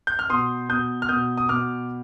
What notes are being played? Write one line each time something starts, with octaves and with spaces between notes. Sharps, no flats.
G6
F6
B2 C6 D#6
B2 D#6 G6
F6
B2 D#6 G6
D#6
B2 D6 F6